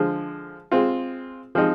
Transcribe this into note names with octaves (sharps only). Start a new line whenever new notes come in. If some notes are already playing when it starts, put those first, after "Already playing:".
Already playing: D3 F3 G#3
G#3 C4 F4
F3 G#3 C4 D#4